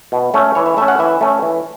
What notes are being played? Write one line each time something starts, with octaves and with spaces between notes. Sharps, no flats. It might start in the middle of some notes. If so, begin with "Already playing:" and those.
B2
A3 C#4
E3 C#5
E5
A3 C#4 E5
F#5
E3 E5
A3 C#4
E3